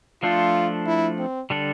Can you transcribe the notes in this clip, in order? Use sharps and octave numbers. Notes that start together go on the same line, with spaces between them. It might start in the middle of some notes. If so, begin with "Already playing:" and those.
F3 A3 D4 F4 A4 C5
E4
C4
D3 G3 D4 A4